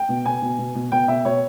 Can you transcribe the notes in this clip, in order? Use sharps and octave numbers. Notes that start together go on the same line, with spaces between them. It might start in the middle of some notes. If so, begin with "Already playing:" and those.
Already playing: G5
B2
B2 G#5
B2
B2
B2
B2 G5
B2 E5
B2 C#5